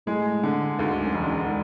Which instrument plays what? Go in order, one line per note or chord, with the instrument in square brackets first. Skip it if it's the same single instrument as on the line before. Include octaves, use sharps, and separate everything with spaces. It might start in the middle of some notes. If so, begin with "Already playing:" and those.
[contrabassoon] A2 [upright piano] G#3
[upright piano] D3
[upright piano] D2 [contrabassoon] G#2
[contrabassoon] F#2
[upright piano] E1
[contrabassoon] G#2